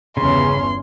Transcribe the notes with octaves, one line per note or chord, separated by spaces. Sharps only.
G1 E2 C#3 C#4 C6